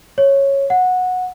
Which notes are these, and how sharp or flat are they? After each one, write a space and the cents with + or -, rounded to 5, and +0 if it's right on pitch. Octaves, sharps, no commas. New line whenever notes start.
C#5 -10
F#5 -15